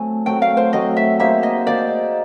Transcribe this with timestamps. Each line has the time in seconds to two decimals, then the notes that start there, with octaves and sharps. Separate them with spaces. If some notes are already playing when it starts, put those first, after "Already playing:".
Already playing: F#3 A3 C4 G#5
0.26 F#3 A3 C4 G5
0.42 F5
0.57 C5
0.73 F#3 A3 C4 D#5
0.97 E5
1.20 A#3 D#4 G#4 C5 E5
1.43 D#5
1.66 A#3 D#4 G#4 C5 D5